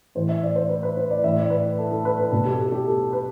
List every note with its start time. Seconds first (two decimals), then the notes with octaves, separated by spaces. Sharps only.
0.15 A2 E3 C5
0.29 E5
0.43 D5
0.56 C5
0.69 B4
0.83 B4
0.97 C5
1.11 D5
1.24 A2 E3 E5
1.38 D5
1.50 B4
1.78 A4
1.92 A4
2.05 B4
2.19 B4
2.32 B2 A4
2.45 G4
2.66 A4
2.72 G4
2.87 A4
3.13 B4